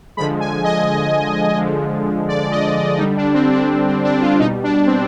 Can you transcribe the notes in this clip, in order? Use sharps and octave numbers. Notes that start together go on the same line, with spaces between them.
D3 F3 G#3 B5
G#5
D#5
D3 F3 G#3
D5
D#5
D5
D3 G3 D#4
D4
C4
D4
D4
C4
D4
F4
B2 G3 D#4
D4
C4